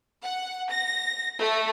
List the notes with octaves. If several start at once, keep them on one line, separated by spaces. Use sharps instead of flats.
F#5
A#6
A3